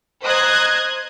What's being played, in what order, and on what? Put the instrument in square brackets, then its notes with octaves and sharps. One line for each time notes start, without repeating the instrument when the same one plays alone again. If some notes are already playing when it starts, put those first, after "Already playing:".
[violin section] C5 D#5 A#5 D#6 F#6 G#6